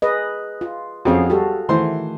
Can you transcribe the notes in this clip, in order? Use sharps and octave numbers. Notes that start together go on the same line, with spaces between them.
G#4 B4 D#5
F4
F2 C4 C#4 F#4 G#4 F5
G3 F#4 A4
D#3 E3 A3 E4 C5 C6